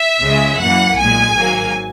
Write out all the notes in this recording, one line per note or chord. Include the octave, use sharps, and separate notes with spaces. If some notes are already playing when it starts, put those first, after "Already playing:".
Already playing: E5
C#2 C#3 G#3
F#2 E3 A#3 F#5
B1 A#2 G#3 G#5
G#1 G#2 F#3 A#3